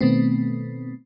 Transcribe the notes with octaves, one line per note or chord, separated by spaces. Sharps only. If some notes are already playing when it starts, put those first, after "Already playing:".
B2 D#3 A3 B3 C4